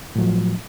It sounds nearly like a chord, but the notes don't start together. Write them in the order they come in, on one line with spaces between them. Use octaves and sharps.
A2 F#3 F3